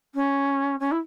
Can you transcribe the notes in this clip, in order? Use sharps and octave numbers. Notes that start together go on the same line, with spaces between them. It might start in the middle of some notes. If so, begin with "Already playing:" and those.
C#4
C#4
E4